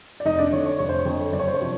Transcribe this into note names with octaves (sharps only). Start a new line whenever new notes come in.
D5
F1 D#4 D#5
D4 D5
F2 D3 C#5
C#5
F1 C#5
C5
C#5
F2 D3
F#1 D5
C#5
C5
C#5
C3 F3